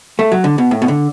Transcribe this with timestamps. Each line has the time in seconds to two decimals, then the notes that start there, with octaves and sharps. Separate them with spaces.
0.19 A3
0.32 F#3
0.44 D3
0.58 B2
0.71 A2
0.82 B2
0.88 D3